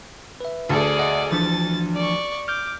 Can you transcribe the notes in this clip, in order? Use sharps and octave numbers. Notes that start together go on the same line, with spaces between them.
B4 E5
D2 G#4 A4 D5
D#5 E5 F#5
E3 F3 D4 A6
D5 C#6
D6 F6 G6